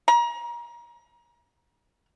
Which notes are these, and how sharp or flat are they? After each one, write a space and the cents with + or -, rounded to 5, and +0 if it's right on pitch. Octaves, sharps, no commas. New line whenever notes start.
A#5 +30